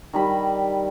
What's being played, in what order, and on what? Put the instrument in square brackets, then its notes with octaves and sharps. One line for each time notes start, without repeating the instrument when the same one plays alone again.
[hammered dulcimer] D#3 G3 B5